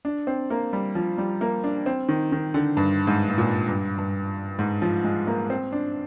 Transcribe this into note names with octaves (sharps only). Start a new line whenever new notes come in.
D4
C4
A#3
G3
F3
G3
A#3
D4
C4
D#3
D#3
D3
G2
G#2
G#2
A#2
G2
G2
G#2
F3
G#3
A#3
C4
D4